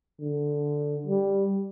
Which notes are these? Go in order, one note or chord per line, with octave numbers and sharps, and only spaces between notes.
D3
G3